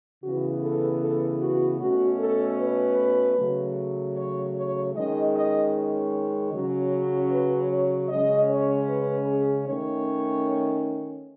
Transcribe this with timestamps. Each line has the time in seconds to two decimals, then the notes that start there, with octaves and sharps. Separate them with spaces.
0.21 C#3 E3 B3 F#4
0.61 A4
1.00 A4
1.40 F#4
1.79 B2 A3 C#4 F#4
2.19 A4
2.58 B4
3.36 C#3 F#3 A3
4.16 C#5
4.54 C#5
4.94 D#3 G#3 C#4 D#5
5.33 D#5
5.73 C#5
6.52 C#3 F#3 C#4
7.31 B4
7.70 C#5
8.09 C#3 G#3 C#4 D#5
8.49 C#5
8.89 B4
9.28 G#4
9.67 D#3 A3 C#4 C#5